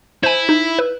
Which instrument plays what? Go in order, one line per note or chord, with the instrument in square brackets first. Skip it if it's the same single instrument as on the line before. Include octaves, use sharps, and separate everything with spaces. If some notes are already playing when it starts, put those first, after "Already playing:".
[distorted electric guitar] E4 [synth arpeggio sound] C5 G#5
[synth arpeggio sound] D#4
B4